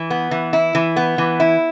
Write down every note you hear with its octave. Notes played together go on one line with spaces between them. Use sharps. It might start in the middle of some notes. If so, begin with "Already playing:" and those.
Already playing: E3
B3
E3
E4
E3
B3
E3
E4